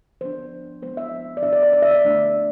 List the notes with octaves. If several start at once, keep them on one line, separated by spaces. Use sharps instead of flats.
F3 B3 D4 C5
F3 G#3 B3 C5
E5
D5
B2 B3 D4 E5
D5
D5
D5
E5
D5
D3 A3 D4